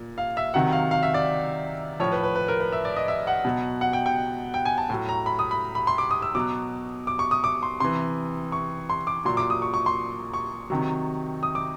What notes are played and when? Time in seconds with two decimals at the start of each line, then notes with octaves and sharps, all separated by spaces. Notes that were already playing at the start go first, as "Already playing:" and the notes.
Already playing: A#2
0.18 F5
0.37 E5
0.54 C3 D#3 F#3 F#5
0.72 F5
0.91 F5
1.03 E5
1.14 D5
2.00 A2 F3 C#5
2.12 B4
2.23 B4
2.36 B4
2.48 A#4
2.60 B4
2.72 E5
2.85 D5
2.96 D#5
3.08 E5
3.27 F#5
3.45 B2 F#3
3.81 F#5
3.93 G5
4.06 G5
4.54 G5
4.65 G#5
4.78 A5
4.90 A2 F#3
5.09 A#5
5.26 B5
5.39 D#6
5.51 B5
5.75 B5
5.87 C6
5.98 D6
6.11 D#6
6.22 E6
6.35 B2 F#3 D6
7.07 D6
7.19 C#6
7.31 D#6
7.44 D6
7.63 C6
7.80 C3 E3 C6
8.52 C#6
8.90 C6
9.07 D6
9.25 A#2 F#3 C6
9.37 D6
9.50 D#6
9.62 C#6
9.74 C#6
9.86 C6
10.34 C#6
10.70 C3 D#3 F#3
11.43 D#6
11.55 D6